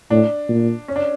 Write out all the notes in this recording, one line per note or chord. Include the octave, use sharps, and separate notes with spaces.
A2 D4
A#2
C#4
D4